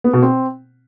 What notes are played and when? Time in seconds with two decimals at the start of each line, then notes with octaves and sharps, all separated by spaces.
0.04 B3
0.13 B2
0.22 C4